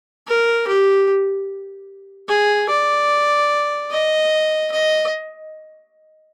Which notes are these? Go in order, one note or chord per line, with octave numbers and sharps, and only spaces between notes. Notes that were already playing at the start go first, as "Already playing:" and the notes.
A#4
G4
G#4
D5
D#5
D#5